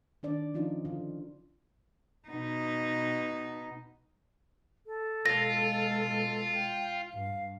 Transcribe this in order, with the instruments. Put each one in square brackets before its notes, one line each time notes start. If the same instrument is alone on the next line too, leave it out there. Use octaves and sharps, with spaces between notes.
[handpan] D#3 D4 D5
F3 C#4 D#4 F4 D5
D3 F4
[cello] B2 D#4
[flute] A4
[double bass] B2 G#3 [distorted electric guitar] F4 [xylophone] A#6
[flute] G5
[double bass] G2 [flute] F5